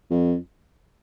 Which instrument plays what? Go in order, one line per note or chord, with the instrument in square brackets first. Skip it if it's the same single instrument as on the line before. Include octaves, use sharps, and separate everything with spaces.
[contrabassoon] F2